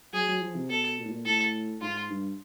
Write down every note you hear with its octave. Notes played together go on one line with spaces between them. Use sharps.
F#3 G#4
F#3
F3
C3
B2 A4
A#2
A2
A#2
A2 A4
G#2 F4
G2